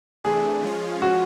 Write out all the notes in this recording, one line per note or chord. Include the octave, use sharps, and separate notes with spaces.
C3 E3 A3 D4 G#4
F3 G#3 C#4 F4
F#4